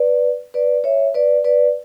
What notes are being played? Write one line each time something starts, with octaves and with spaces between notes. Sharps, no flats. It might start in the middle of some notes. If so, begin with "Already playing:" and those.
Already playing: B4 D5
B4 D5
C#5 E5
B4 D5
B4 D5